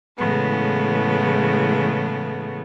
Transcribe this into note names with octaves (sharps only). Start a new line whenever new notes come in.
A2 C#3 E3 G#3 A3 B3